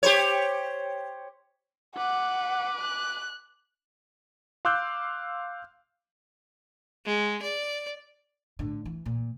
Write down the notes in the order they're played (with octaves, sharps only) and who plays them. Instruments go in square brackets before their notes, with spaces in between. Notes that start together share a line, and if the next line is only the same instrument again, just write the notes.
[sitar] G4 C5 C#5
[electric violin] B4 D6 [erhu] F#5
[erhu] F#6
[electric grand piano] F5 C6 D6 E6 F#6 G6
[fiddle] G#3
D5
[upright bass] A2 D3
E3
A#2